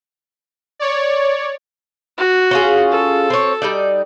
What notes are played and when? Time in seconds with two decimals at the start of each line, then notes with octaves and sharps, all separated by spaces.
0.79 C#5 D5
2.18 F#4
2.51 C#4 F4 G#4
2.91 A4
3.30 C4 C#5
3.62 G3 D#4 D5